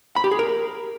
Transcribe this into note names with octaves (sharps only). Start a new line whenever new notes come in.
B5
G4
G#4
A#4